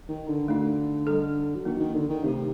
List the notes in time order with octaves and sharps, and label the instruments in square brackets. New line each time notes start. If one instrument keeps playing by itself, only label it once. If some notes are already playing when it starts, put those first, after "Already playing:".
[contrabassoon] D#3
D3
[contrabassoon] D3 [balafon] A3 D#4 F#4
[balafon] G3 D4 A4
[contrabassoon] F#3
[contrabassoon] D#3 [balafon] A#3 D4 F#4
[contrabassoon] D#3
D3
D#3
[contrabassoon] C3 [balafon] A3 D#4 G4